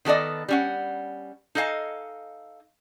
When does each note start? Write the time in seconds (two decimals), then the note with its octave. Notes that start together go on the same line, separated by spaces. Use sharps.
0.05 D#3 B3 A4 D5 D#5
0.48 G3 C#4 F#5
1.55 D#4 A4 D#5 F5 G#5